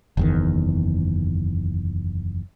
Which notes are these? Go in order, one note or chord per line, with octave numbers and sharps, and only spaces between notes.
F#1 E2 D#3